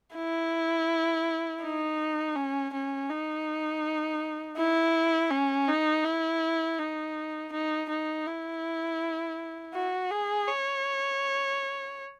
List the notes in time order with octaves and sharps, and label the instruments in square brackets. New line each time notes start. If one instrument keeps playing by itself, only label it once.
[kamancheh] E4
D#4
C#4
C#4
D#4
E4
C#4
D#4
E4
D#4
D#4
D#4
E4
F#4
G#4
C#5